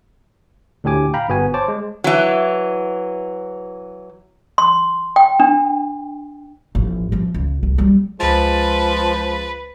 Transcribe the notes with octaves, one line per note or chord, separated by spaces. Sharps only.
D2 A2 D3 G4 G#5 D6
F5 G5 A#5 B5
G1 B3 F#4 G#5
C5 C#5 A5 D6
G#3
E3 F#3
C6
G5
D4
A1 F3
F#2 F3
C#2
C2
F#3 G3
C#2 F3 G#3 B4 A6